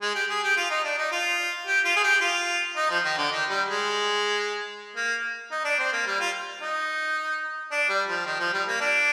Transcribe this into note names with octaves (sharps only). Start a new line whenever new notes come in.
G#3
G4
G#4
G4
F4
D#4
D4
D#4
F4
G4
F4
G#4
G4
F4
D#4
F3
D#3
D3
D#3
G3
G#3
A#3
D#4
D4
C4
A#3
G3
F4
D#4
D4
G3
F3
D#3
F3
G3
A#3
D4